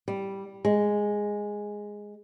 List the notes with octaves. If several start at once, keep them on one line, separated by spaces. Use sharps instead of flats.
G3
G#3